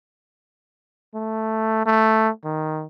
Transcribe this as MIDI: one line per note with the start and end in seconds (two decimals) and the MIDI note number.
1.15 1.82 57
1.86 2.29 57
2.45 2.86 51